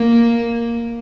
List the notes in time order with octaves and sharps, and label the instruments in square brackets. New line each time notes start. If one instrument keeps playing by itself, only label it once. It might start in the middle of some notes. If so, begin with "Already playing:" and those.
Already playing: [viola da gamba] A#3